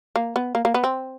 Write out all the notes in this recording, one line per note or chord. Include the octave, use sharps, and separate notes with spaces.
A#3
B3
A#3
A#3
B3
C4